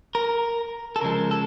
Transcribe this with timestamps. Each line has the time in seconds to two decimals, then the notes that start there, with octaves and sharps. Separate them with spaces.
0.15 A#4
0.96 A4
1.01 C#3 F3 G#3 A#4
1.31 A4